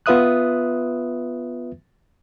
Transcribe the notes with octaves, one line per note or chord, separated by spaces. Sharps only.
B3 F4 B4 E5 D#6 F#6